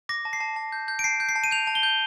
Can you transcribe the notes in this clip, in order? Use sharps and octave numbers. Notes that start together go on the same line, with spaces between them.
D6 A#6
A5
C7
A5
A5
G6
G6
D7
A5 C7
G6
C7
A5
D#7
G6 F7
A5
G7
G6